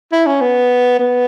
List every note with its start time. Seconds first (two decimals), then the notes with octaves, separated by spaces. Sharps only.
0.12 E4
0.26 C#4
0.41 B3
0.99 B3